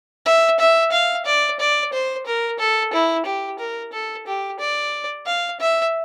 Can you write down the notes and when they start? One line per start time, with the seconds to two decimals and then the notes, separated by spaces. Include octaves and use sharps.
0.26 E5
0.60 E5
0.92 F5
1.26 D5
1.60 D5
1.93 C5
2.26 A#4
2.59 A4
2.93 E4
3.26 G4
3.59 A#4
3.92 A4
4.27 G4
4.59 D5
5.26 F5
5.60 E5